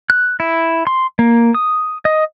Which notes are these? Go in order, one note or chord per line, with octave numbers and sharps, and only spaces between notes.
F#6
E4
C6
A#3
D#6
D#5